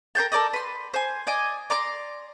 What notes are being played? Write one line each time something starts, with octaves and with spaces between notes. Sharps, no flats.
A#4 C5 G5 A5
A4 A#4 D5 D#5
B4 C6
C5 G#5
D5 D#5 G#5 D6
D5 A#5 C6 D6